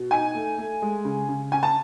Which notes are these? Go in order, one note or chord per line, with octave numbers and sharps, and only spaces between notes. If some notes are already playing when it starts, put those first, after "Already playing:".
Already playing: B2
D#4 G#5
A3
A3
G#3
C#3
C#3
C#4 G#5
A5